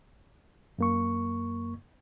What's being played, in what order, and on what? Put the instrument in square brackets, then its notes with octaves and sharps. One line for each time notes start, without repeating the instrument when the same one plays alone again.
[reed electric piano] F#2 A#3 C#6